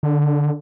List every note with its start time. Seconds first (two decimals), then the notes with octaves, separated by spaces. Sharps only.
0.03 D3